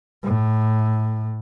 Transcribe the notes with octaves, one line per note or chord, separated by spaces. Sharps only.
A2